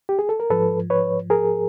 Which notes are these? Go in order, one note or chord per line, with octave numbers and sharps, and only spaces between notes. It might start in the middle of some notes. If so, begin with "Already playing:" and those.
G4
G#4
A4
A#4
G#2 F3 A4 B4
B4 C#5
G#4 A#4